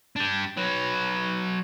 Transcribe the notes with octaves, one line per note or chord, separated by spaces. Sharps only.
D4 G4
F#3 B4